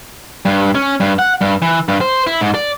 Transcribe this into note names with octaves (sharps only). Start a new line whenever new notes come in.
G2
C#4
G2
F#5
G2
E3
G2
C5
E4
G#2
D5